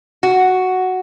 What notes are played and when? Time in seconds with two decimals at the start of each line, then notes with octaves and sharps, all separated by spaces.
0.23 F#4